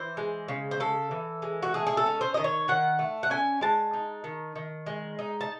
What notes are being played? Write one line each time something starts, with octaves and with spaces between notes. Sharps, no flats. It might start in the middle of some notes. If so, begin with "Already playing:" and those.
Already playing: E3 C5
G#3
C#3
C5
C#3 A4
E3
G#3
F#4
A3 G#4
G#4
A4
C#4
C5
D#3 D#5
C#5
D#3 F#5
A3
F#5
C#4 G#5
G#3 A5
D#4
D#3
D#3
G#3
D#4
A5